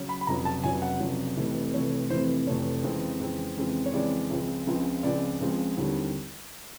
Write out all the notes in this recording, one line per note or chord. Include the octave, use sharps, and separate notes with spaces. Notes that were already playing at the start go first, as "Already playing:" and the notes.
Already playing: C#3 F#3
B5
B5
F1 F2 C#3 F#3 A#5
A5
F1 F2 C#3 F#3 G#5
F#5
F1 F2 C#3 F#3
F1 F2 C3 E3 A3
F1 F2 C3 E3 A3 C#5
F1 F2 C3 E3 A3 C5
F1 F2 C3 E3 A3 C#5
F2 C#3 E3 G#3 C4
F2 C#3 E3 G#3 C4
F2 C#3 E3 G#3 C4
C#5
F2 C#3 E3 G#3 C4 D5
C#2 C#3 F3 G#3 C4
C#2 C#3 F3 G#3 C4
C#2 C#3 F3 G#3 C4 D5
C#2 C#3 F3 G#3 C4
D#2 D3 G3 C4 E4